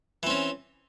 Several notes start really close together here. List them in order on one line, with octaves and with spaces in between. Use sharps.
E3 C4 C#4